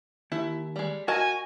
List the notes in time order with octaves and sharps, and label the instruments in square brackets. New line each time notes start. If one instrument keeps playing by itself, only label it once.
[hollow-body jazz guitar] D#2 [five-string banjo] E4
[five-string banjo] G3 G#3
[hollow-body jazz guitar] F#4 [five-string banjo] A#4 D#5 A5 [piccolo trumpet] G#5